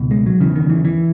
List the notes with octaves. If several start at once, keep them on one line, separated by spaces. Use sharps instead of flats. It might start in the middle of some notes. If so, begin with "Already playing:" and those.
Already playing: C#2 B2
G#3
F#3
E2 C#3 E3
D#3
E3
E3